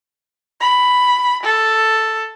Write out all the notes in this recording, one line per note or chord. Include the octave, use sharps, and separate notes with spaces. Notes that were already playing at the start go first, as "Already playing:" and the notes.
B5
A4